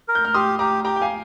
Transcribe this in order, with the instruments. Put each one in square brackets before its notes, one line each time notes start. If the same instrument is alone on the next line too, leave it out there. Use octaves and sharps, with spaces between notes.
[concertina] A#4
[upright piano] G6
F6
[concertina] G4 [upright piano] C6 D#6
[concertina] G4 [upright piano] A#5 D6
[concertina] G4 [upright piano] G5 A#5
[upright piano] G5
F5 G#5